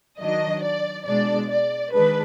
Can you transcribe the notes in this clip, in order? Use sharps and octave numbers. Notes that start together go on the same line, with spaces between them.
D#3 F#3 D4 D#5
D5
B2 G#3 D4 D5
D5
D#3 G#3 D4 B4